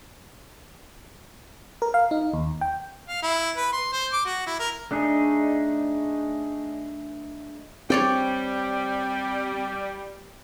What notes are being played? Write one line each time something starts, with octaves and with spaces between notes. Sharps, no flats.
A#4
F5
D#4
D#2
G5
F5
E4
B4
C6
C5
D6
F#4
E4
A#4
A3 D4 D#4 G#4
G3 C4 C#5 D5 G5